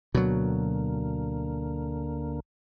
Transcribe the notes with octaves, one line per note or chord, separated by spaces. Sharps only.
D2 B2 D3 F#3 A#3